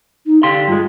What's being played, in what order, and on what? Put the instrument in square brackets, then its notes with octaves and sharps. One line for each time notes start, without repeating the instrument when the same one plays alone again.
[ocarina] D#4
[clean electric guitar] D3 G4 C6 [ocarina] F5
[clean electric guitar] G2 G#3 [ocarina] F4